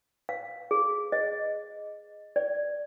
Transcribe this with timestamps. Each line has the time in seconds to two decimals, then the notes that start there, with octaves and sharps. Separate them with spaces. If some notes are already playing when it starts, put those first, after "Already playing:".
0.29 F5
0.71 G#4
1.12 D#5
2.36 D5